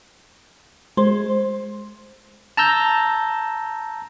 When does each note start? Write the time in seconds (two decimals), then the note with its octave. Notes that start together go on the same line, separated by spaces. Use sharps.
0.97 G#3 C5
2.57 A5 A#5 E6 G6